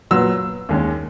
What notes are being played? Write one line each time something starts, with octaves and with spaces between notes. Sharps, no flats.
A#2 F#3 B3 E6
D#2 D#3 G#3 C#4